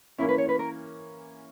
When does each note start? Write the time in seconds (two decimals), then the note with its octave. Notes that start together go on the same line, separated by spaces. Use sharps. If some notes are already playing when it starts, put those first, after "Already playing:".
0.19 E3 A#3 C#4 E4
0.29 B4
0.38 C#5
0.49 B4
0.59 A#4